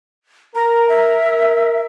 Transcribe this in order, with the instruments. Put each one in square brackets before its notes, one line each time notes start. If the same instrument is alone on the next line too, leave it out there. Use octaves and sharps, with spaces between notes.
[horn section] A#4 [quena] A#5
[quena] E5